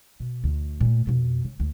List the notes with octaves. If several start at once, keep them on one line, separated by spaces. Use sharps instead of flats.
B2
D2
A#2 A3
F2 B2
C#3
D2